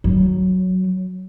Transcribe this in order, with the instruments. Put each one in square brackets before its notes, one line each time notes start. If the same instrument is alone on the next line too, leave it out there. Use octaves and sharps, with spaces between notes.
[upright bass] F#3